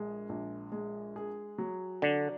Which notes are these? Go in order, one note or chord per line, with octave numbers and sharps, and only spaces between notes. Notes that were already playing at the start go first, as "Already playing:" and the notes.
Already playing: A#1 G#3
A#1
G#3
G#4
F#3
D3 D4